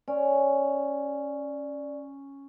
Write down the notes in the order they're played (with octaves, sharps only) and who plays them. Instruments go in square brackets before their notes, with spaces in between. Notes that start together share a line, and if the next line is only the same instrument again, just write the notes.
[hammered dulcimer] C#4 [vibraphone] D5